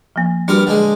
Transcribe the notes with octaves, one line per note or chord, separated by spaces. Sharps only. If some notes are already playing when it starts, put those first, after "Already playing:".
F3 A#3
G3 D4 F#4 A#4 B4
D3 G#3